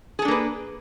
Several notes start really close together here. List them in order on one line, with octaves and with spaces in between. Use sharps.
G#4 A4 D4 A#3 B4